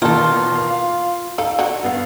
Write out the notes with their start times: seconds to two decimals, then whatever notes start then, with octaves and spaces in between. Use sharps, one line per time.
0.02 E2 B2 D#3 A#3 F4 A4
0.56 F5
1.38 D#3 A4 F5 E6
1.59 D3 F#4
1.83 G2 B3 F5